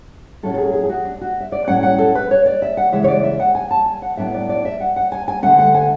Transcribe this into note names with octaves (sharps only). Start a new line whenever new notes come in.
A2 F#3 C#4 A4
A4
G#4
G#4
G#4
F#4
D4
F#4
E5
D5
A2 F#3 C#4 F#5
F#5
A4
B4
C#5
D5
E5
F#5
C#3 E3 G#3 E5
C#5
D5
E5
F#5
G#5
A5
G#5
F#5
A2 F#3 B3 D4 E5
D5
D5
E5
F#5
F#5
G#5
G#5
D2 D3 A3 C#4 F#5
F#5
G#5